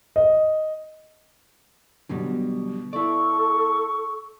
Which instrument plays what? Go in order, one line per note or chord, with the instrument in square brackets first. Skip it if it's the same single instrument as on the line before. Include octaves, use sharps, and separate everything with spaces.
[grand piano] D#5
[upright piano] B2 [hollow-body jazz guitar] D3 F#3 G3
[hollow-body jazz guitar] E4 D5 [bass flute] A4 [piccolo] C#6